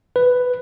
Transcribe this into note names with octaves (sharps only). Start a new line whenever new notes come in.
B4